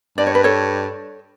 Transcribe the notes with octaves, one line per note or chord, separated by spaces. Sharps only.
G2 D5
C#5
B4
A4 C#5